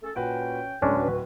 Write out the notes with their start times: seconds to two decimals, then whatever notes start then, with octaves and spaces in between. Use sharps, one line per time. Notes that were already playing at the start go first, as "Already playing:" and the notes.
0.03 A3 C#4 A4
0.16 A#2 C#4 F#4 B4 G5
0.82 D1 G#3 C#4 D4
0.97 F#4 B4